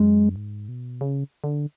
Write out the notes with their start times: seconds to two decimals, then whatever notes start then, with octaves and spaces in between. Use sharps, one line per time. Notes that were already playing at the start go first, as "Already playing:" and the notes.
Already playing: F#2 G#3
0.36 G#2
0.68 B2
1.01 C#3
1.44 D3